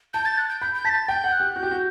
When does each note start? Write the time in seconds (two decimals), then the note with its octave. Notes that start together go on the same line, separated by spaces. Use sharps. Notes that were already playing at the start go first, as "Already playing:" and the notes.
0.14 A5 G6
0.25 A6
0.38 F#6
0.49 G6
0.61 B5 G6
0.74 G6
0.85 A5 B6
0.90 A6
1.08 G5 G6
1.24 F#5
1.32 F#6
1.40 G4
1.56 F#4 G6
1.63 G4
1.71 F#4